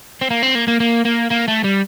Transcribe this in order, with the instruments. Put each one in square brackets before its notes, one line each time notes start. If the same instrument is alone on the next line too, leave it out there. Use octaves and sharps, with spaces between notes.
[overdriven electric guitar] C4
A#3
C4
A#3
A#3
A#3
A#3
A#3
A3
G3